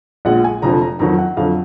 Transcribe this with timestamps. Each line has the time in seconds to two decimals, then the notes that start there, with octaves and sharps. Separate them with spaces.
0.25 A#1 A#2 G#3 F#5
0.44 G#5
0.62 F1 F2 D3 F3 A#5
0.81 A#5
0.99 F2 D#3 F#3 A#5
1.19 F#5
1.37 F2 D3 F#3 F5